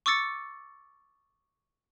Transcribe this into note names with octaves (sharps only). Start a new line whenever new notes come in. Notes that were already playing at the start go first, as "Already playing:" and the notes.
C#6 D6 E6 A6 C#7